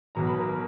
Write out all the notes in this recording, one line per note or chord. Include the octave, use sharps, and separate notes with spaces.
B1 B2 F#3 A#5
B5
A#4 A#5